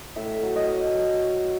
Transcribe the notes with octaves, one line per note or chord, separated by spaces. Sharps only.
A2 E5
F#3
D#5